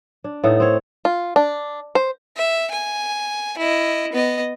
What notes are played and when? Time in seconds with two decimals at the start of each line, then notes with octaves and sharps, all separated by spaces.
0.24 D4
0.44 A2 B3 D#4 A4
0.60 C4 C#5
1.05 F4
1.36 D4
1.95 C5
2.37 E5
2.71 G#5
3.58 E4 D#5
4.13 B3 D#5